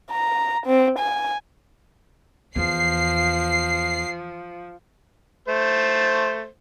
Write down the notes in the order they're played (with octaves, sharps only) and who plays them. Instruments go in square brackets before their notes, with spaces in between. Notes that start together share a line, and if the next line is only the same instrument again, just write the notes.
[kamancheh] A#5
C4
G#5
[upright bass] E2 [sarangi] F3 [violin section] C7
[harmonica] A3 C5